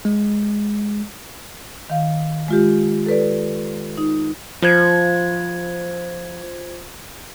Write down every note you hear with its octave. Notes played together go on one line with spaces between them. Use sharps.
G#3
D#3 F5
G#3 F4 G4
A4 B4 D5
D#4
F3 F4 C5 G#6